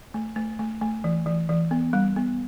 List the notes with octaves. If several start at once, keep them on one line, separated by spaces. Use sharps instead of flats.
A3
A3
A3
A3
E3
E3
E3
B3
G3
B3